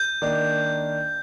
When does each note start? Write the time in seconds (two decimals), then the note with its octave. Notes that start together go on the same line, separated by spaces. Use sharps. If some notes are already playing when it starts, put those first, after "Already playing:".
Already playing: G6
0.22 D#3 A#3 D4